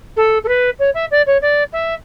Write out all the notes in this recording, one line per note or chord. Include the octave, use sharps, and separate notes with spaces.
A4
A4
B4
C#5
E5
D5
C#5
D5
E5